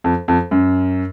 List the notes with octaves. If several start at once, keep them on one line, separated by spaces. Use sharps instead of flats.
F2
F2
F#2